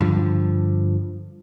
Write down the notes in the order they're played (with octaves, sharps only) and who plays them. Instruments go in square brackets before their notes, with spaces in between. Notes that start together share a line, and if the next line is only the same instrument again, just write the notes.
[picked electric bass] G2 D3 F3